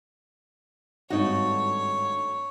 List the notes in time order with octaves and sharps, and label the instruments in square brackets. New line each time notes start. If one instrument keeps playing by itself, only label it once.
[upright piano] G#1 G2 [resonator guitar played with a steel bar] A3 D#4 F#4 [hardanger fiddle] C#5